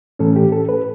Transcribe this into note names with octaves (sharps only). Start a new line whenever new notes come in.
A2 E3 A3 C#4 A4
G4
A4
B4